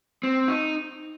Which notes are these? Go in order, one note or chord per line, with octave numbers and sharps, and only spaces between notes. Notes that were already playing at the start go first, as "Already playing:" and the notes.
C4
D#4